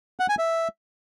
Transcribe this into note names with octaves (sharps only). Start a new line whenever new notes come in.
F#5
G#5
E5